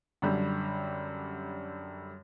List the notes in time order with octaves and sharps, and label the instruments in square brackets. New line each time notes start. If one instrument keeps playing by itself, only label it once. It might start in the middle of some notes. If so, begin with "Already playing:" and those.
[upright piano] F#2 D3 G3